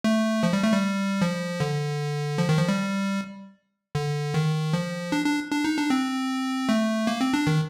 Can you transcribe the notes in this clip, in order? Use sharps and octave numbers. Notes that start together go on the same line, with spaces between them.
A3
F3
G3
A3
G3
F3
D3
F3
D#3
F3
G3
D3
D#3
F3
D4
D4
D4
D#4
D4
C4
A3
A#3
C4
D4
D#3